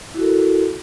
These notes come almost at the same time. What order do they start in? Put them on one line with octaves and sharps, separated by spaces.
E4 F#4 A4 A#4